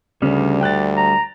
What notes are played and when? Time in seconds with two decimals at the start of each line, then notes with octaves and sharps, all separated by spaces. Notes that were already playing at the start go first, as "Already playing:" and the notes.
0.22 D2 C#3 G3
0.61 G5 F#6 A6
0.97 A#5